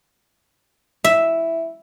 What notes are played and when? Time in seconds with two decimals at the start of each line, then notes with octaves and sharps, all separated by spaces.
1.04 E4 E5